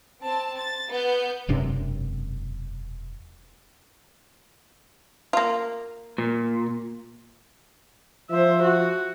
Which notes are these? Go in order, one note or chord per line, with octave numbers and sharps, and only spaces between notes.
C4 A5
A6
B3 G6
E1 F#2 C3 D4
A#3 F4
A#2
F3 C5 E5
F#4